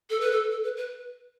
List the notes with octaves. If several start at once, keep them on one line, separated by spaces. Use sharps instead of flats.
A4
B4
A4
A4
B4
B4